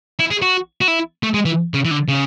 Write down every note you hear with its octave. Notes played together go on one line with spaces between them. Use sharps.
E4
G#4
F#4
F#4
E4
A3
G#3
E3
C#3
E3
D3
C#3